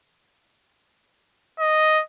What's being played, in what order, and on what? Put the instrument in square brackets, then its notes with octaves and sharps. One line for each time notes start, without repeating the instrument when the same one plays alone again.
[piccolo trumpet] D#5